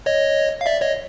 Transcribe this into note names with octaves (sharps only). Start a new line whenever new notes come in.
C#5 D#5
F5
D5 E5
C#5 D#5